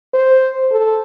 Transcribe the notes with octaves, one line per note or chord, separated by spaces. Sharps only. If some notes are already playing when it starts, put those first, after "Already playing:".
C5
A4